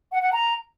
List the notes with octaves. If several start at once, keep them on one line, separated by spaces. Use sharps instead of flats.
F#5
F#5
A#5